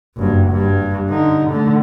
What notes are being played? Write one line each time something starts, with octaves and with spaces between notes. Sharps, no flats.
F#1 G2
G2
D3 D#4
D3 A3